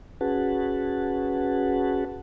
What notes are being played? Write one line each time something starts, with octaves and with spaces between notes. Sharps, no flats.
C#4 F#4 G#4 B4 F#5 A5